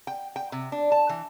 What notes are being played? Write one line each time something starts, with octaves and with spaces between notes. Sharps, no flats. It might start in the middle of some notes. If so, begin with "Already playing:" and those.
G5
G5
C3
D4
A5
E3